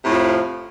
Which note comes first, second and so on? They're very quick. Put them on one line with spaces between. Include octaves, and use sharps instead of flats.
C3 A2 F3 F2